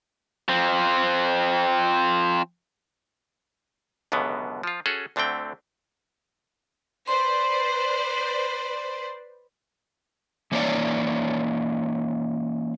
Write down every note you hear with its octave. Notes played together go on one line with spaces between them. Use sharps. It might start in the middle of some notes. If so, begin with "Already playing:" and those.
F3 C4
C#2 F#2 B2 D3 B3
F3 F4
C#4 F#4 G#4 A4
D2 D3 A3 C4 G5
B4 C5 D5 C6
E3 A#3 C#4 D#4 C#5 D5